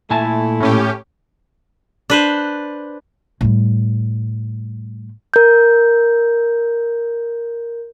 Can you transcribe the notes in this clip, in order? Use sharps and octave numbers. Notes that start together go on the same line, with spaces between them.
A#2 A3 E4 G#5 A5
A2 C#4 G4
D4 B4 C5
A2 G3
A#4 G6